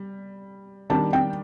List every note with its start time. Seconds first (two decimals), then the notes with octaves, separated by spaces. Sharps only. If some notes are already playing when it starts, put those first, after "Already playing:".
Already playing: G3
0.90 D#3 G3 D4 A5
1.13 G5